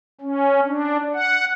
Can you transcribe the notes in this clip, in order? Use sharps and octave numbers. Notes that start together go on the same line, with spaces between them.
C#4
D4
F#5